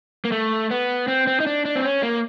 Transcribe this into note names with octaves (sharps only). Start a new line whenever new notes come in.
A#3
A3
B3
C4
C4
D#4
D4
D4
C4
C#4
A#3